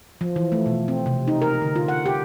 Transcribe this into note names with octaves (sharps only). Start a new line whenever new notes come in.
F3
E3
A3
B2
C4
C3
D#4
A#4
D3
F4
F#5
G4